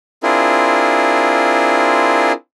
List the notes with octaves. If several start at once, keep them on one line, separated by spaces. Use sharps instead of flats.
C4 D4 E4 F4 G#4 A#4